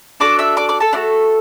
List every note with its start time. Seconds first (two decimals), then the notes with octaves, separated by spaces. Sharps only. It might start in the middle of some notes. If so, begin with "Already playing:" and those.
0.20 D4 F#4 A4 D5 D6
0.39 E5 E6
0.57 D5 D6
0.69 D5 D6
0.80 A4 A5
0.93 A3 D4 F#4 A4 D5